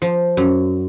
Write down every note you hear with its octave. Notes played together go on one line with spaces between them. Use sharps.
F3
F#2